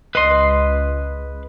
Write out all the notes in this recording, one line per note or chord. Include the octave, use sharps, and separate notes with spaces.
C#2 B4 D#5 C6